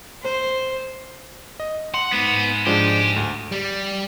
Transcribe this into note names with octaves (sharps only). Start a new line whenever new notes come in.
C5
D#5
F#5 C6
G#2 B3
F3 G#3 D4 G4
D2
G3